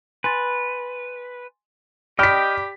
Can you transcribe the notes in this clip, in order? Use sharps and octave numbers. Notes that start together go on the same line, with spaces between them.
B4 G#5 C6 A6
G4 D5 D#5 G5 B5 F6 B6